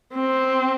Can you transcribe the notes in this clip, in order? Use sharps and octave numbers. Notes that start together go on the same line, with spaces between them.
C4